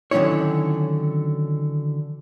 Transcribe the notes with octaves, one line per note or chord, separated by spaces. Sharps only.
D3 D#3 F#3 C#4 E4 C#5